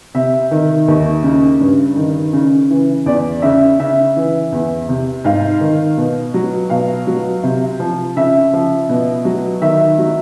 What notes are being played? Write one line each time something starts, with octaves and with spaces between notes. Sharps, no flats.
C3 E5
D#3
D#2
C#3
G2
D#3
C#3
E3
E2 D5
C#3 E5
C#3 E5
E3
E2
C3
G#2 F5
D#3
B2
F#3
B2 F5
F#3
C3
F3
C#3 E5
F3
B2
F#3
D#3 E5
F#3